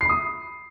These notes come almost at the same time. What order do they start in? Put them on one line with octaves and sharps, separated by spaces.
C7 B5 D#6